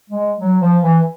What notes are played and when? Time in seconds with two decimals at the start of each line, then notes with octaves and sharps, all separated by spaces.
0.10 G#3
0.39 F#3
0.61 F3
0.82 E3